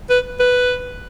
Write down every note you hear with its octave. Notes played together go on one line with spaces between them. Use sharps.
B4
B4